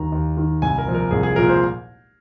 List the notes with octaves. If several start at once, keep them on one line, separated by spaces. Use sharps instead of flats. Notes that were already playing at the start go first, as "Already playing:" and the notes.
Already playing: D#2 D#3 A#5
D#2
D#3
C2 G#5
A#4
A#2 F3
A#4
C2 G#4
G#4
A#2 F3 A#4
C5